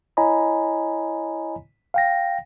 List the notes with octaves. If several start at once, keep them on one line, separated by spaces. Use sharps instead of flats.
E4 C#5 D#5 G#5 A#5 B5
F5 G5 A#6